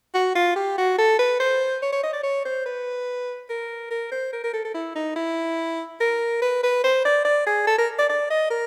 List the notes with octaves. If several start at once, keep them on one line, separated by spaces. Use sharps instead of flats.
F#4
F4
G4
F#4
A4
B4
C5
C#5
C#5
D#5
D5
C#5
C5
B4
A#4
A#4
C5
A#4
A#4
A4
A4
E4
D#4
E4
A#4
B4
B4
C5
D5
D5
G#4
A4
A#4
D5
D5
D#5
A#4